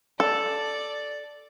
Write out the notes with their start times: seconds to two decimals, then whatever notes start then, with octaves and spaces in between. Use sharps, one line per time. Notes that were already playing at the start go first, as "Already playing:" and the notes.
0.20 A4 D5